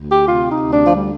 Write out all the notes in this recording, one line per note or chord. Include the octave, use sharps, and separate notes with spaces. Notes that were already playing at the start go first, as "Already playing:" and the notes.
Already playing: D2
G4
C3 F4
D#4
D2
D4
F3
D3 G3